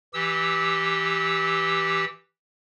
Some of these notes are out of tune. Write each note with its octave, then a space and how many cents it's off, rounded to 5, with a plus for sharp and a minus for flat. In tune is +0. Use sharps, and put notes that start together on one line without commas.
E3 +0 G4 +0 E6 -25